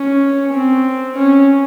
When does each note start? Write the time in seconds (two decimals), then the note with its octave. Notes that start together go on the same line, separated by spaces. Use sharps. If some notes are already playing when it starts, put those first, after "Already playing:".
Already playing: C#4
0.52 C4
1.15 C#4